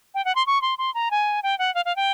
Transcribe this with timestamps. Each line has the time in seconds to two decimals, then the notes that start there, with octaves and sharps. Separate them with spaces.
0.14 G5
0.25 F#5
0.35 C6
0.47 C#6
0.62 C6
0.78 C6
0.94 A#5
1.11 G#5
1.43 G5
1.59 F#5
1.75 F5
1.85 F5
1.96 G5